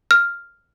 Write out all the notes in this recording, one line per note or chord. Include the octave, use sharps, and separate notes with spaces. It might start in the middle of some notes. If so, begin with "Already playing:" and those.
F6